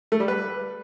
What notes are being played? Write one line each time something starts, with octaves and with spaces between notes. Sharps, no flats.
A3
G3
B4